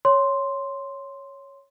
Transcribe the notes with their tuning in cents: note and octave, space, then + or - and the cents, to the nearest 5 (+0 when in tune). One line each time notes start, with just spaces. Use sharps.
C#5 +0 C6 +0